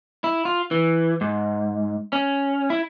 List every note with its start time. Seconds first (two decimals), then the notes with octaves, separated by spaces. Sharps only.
0.24 E4
0.45 F4
0.71 E3
1.21 G#2
2.13 C#4
2.70 E4